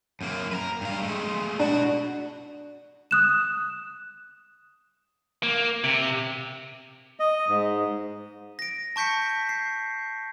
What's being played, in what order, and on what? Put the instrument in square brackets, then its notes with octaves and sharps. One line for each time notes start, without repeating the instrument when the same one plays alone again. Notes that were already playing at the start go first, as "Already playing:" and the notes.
[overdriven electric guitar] F#2 A#3
A#4 B4
G2 F5
G#3 A3
[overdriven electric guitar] B3 F#4 [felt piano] D4
[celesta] D#6 F#6 E7
[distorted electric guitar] A#3
C3
[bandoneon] D#5
G#2
[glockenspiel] A#6 D7
A5 C#6 G6 B6 C#7
C7